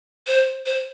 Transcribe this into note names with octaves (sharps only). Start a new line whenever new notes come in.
C5
C5